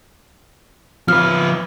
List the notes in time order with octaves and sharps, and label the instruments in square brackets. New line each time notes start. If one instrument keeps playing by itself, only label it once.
[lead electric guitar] F3 B4 [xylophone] F6